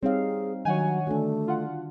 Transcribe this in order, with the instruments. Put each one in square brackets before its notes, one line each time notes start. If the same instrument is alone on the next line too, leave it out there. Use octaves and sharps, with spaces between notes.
[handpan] G3 D#4 F5 [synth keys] C4 [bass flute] G#4 [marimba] C#5
[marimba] D#3 [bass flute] F#3 [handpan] D4 [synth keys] C#5 F#5 G#5
[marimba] D3 [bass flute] A3 [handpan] D4 F#4
[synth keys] F4 F#5